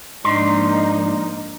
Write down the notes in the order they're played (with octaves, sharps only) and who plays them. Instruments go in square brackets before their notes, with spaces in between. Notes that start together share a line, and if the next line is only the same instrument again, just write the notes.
[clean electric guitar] G#2 C6 [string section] F3 A#3 D#4 [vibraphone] D4 D5 D#5